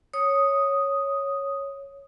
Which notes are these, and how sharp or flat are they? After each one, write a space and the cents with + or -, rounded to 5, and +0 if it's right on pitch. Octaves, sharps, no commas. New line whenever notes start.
C#5 +0 D#6 +0